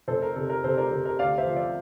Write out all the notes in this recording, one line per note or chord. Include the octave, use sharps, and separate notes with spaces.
F1 A4 C5
A#4
C3 A4
A#4
C3 A4 C5
A#4 D5
C3 A#4
A#4
D2 D5 F5
C5 E5
F3
D5 F5